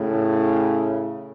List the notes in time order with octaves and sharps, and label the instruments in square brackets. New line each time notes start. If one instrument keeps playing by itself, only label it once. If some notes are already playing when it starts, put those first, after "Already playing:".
Already playing: [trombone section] A2 C#3